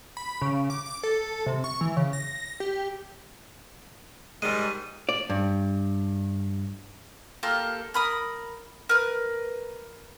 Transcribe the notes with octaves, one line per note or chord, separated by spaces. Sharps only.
B5
C#3
D6
D6
A4
C3
C#6
E3
C#3
A#6
G4
G#2 D#3 G3 G#3 D#7
D5
G2
A#3 F4 G4 A4
A#4 B5 D#6
A#4 B4